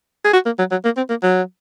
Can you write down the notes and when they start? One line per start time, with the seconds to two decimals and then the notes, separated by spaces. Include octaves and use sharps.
0.25 G#4
0.33 F#4
0.46 A#3
0.59 F#3
0.71 F#3
0.85 A#3
0.97 C4
1.09 A#3
1.22 F#3